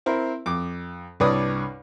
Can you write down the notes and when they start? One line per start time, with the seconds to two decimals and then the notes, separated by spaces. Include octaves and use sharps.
0.06 C4 E4 A#4 C5
0.46 F2 D6
1.20 C2 G2 B4 C#5 D5 D#6